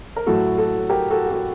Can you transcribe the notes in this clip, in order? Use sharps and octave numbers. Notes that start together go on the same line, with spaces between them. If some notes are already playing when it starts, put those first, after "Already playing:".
A#4
A2 F#3 F#4 A4
F#4 A4
G4 A#4
F#4 A4
G4
F#4 A4